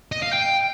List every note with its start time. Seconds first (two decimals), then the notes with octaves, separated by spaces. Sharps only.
0.12 D#5
0.22 F5
0.33 G5